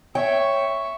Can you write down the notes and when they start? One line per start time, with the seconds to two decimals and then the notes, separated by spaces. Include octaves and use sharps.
0.15 C#5 E5 G5 C#6